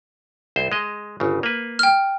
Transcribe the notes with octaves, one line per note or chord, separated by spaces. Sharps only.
C2 C5
G#3 D#5
G1 C#3
A#3 B4
G5 F6